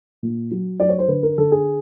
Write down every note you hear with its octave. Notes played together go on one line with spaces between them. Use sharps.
A#2
F#3
F#3 D5
C#5
C5
D3 B4
A#4
D3 A4
G#4